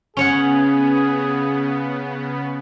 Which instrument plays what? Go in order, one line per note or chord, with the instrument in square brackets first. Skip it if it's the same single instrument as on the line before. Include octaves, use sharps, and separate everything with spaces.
[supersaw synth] C#3 B3 [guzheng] C#4 C#5 F#5 [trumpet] G#4